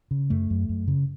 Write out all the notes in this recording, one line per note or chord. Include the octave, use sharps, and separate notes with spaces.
C#3
F#2 A3
F#2
F#2
C#3